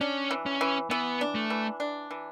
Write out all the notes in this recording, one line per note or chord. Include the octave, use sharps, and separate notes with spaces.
C#4 D4
E3
C#4
E3
E3 B3
D4
A3
E3
D4
E3